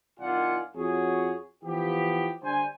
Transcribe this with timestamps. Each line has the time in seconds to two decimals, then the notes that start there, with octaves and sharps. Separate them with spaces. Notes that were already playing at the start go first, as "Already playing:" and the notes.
0.20 C2 D#3 F4 D5 F#5 G#5
0.75 F2 F#4 G#4 C#5
1.64 E3 F3 B3 G4
2.43 D3 G3 C5 G#5